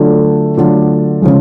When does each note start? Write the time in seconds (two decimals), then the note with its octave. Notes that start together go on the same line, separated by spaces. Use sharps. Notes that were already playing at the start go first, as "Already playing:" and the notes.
Already playing: D3 F#3 A3 D4 F4
0.57 D3 F#3 A3 D4 F4
1.22 C#3 F3 G#3